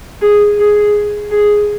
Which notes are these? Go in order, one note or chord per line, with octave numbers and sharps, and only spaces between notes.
G#4
G#4
G#4